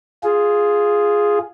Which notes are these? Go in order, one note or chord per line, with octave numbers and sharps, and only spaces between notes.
F4 G#4